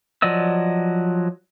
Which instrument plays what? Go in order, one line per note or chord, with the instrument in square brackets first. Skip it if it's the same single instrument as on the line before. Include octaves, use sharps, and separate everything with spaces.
[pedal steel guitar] F3 F#3 D5 D#5 E6